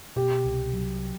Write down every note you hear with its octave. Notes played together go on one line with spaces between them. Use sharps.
B2 G4
C2
F#3